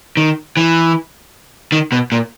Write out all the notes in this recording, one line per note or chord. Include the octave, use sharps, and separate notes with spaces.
D#3
E3
D#3
B2
A#2